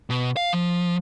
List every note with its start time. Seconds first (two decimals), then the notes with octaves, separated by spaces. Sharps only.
0.10 B2
0.37 F5
0.53 F3